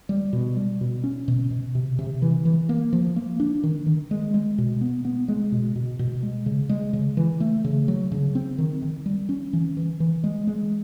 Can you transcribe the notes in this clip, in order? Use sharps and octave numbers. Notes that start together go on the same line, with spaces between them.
G3
B2
G3
B2
C#4
B2
B2
C3
C3
E3
E3
A#3
F3
A#3
D4
D#3
D#3
G#3
G#3
B2
B3
B3
G#3
B2
B2
B2
G#3
C#3
G#3
C#3
E3
A3
C#3
F#3
C#3
C4
D#3
D#3
G3
C#4
E3
E3
E3
G#3
G#3